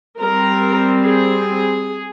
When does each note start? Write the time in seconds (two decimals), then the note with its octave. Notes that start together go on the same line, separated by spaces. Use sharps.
0.20 G3 C4 A#4
1.04 G#4